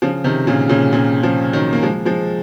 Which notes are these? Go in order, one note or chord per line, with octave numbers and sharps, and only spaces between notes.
C#3 F3
C3 D#3
A#2 C#3
A#2 C#3
A#2 C#3
C#3 F3
D#3 F#3
A#3
F3 G#3
F3 G#3